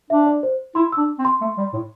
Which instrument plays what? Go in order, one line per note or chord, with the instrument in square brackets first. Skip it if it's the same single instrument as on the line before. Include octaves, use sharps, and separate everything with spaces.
[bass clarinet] D4 [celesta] E5
[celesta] D5
C5
[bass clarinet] E4 [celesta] C6
[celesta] E6
[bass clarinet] D4
C4
[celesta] C6
[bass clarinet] A3
G3
A2